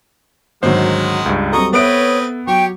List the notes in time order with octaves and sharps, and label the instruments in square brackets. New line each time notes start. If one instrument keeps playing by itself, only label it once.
[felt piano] G#1 D2 G#2 [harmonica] D#3 G#3 F#5 [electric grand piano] F#3 C5
[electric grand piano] C#2 G2
[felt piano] F#3 G3 C4 [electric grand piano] A4 [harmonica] D#5 A#5 C#6
[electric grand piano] B3 D7 [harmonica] C4 B4 D#6 [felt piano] A4 E5 [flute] C#5
[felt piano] F#3 [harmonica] G4 C#5 [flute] G5